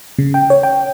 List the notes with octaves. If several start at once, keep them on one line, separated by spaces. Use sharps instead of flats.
C#3
G5
C#5
G5